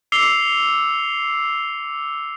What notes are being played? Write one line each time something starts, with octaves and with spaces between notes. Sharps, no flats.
D6 E6 C7 C#7 F7 G7